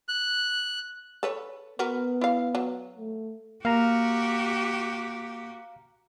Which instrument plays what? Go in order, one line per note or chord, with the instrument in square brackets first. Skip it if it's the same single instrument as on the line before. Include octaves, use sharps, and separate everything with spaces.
[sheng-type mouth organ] F#6
[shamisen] A4 B4 C#5
[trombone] B3 [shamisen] F#4 A#4 B4
[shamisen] E4 F5
F#3
[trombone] A3
[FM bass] A#3 [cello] F#4 G4 [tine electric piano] F5 A#5